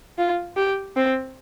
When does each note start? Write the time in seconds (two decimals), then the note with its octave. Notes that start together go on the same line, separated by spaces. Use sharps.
0.18 F4
0.57 G4
0.96 C4